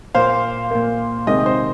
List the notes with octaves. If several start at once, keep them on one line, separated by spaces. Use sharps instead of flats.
A#2 A#3 C5 F5
A#2 A#3
C3 D#3 G#3 C4 D#5
C5